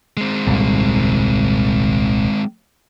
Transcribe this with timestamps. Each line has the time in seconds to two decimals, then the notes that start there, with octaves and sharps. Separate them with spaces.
0.17 G#3 C4
0.47 D#1 C2 G#2